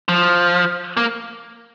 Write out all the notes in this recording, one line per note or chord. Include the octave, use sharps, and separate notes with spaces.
F3
A#3